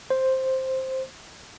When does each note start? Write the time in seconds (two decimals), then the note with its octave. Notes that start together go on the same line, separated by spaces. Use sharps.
0.10 C5